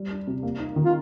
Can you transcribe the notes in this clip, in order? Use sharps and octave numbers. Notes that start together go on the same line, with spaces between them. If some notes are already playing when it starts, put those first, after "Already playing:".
Already playing: G3
D4
C3
A#3
D#4
D#3
F4